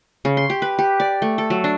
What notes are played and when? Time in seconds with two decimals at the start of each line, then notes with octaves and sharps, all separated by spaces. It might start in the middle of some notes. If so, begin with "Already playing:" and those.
0.25 C#3
0.37 C6
0.50 G4
0.62 B4
0.79 G4
1.00 D5
1.22 A3
1.38 A4
1.50 F#3
1.64 D4